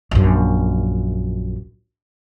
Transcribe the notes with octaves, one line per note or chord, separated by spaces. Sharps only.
A#1 F#2